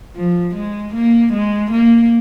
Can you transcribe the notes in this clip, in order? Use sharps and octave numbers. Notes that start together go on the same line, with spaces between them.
F3
G#3
A#3
G#3
A#3